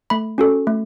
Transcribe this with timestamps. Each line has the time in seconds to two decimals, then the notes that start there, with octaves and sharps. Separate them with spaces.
0.10 A3 B5
0.38 C#4 F#4 A4
0.67 A3